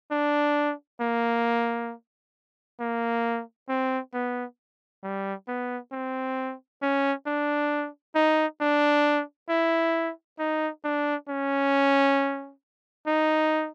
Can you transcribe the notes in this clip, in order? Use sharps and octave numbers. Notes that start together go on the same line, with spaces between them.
D4
A#3
A#3
C4
B3
G3
B3
C4
C#4
D4
D#4
D4
E4
D#4
D4
C#4
D#4